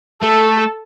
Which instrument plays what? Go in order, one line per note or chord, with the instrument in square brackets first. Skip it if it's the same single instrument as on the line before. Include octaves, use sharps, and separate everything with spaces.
[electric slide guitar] A3 [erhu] A4